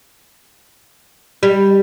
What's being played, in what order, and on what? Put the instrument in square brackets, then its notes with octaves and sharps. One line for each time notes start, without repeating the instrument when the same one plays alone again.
[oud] G3